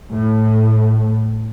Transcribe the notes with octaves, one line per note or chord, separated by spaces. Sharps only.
A2